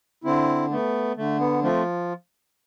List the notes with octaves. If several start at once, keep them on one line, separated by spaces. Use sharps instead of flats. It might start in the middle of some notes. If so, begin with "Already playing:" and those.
D3 C4 E4
A3 B3
D3 A3
B3
F3 A3 C4